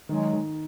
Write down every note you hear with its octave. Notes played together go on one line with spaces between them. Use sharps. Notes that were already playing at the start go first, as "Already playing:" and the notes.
D#3 F#3 G#3
D#3